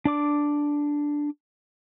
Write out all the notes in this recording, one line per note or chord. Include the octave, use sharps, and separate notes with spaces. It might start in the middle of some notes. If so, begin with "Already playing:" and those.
D4 D5 D6